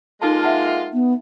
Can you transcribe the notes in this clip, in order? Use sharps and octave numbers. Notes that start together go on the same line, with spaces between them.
G#3 A#3 D#4 F4 A4 A5
E5 F#5 A5
E5
B3